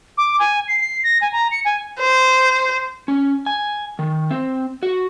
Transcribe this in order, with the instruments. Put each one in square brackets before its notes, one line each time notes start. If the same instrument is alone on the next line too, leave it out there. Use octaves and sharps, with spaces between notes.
[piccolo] D6
G#5
C7
C7
A#6
G#5
A#5
C#7
G#5
[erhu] C5
[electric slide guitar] C#4
G#5
D#3
C4
F#4